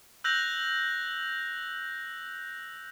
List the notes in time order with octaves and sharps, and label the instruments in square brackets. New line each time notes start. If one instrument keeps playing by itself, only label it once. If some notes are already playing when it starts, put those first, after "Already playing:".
[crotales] E6 F#6 G6 A#6 F7 F#7